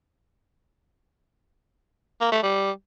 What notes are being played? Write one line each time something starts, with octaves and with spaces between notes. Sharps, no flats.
A#3
A3
G3